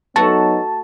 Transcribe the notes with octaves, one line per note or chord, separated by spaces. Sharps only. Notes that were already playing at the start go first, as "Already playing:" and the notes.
F#3 A3 B3 D#4 F#4 A5